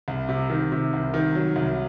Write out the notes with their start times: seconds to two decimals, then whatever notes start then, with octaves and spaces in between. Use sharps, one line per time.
0.08 C2
0.29 C3
0.50 D#3
0.72 C3
0.93 C2
1.14 D#3
1.35 F#3
1.56 C2